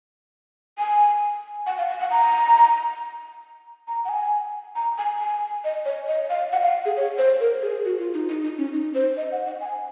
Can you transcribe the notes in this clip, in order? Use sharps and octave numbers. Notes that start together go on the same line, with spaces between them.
G#5
F#5
F5
F#5
F#5
A#5
A#5
F#5
G#5
A#5
G#5
G#5
D#5
C#5
D#5
F5
F#5
F5
G#4
C#5
C5
A#4
G#4
F#4
F4
D#4
D#4
D#4
C#4
D#4
C5
D#5
F#5
F#5
G#5